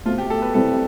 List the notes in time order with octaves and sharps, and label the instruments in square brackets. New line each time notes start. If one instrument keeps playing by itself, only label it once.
[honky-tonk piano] B2 A3 C4 [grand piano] F4
[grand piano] G4
A4
B4
[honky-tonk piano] C3 G3 C4 E4 [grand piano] A4